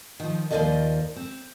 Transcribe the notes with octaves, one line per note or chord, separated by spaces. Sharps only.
D#3 F3
D#2 F3 A3 A#3 D5 D#5
C4